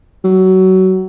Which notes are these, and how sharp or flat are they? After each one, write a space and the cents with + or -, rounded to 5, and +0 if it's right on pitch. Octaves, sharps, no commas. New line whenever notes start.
F#3 +20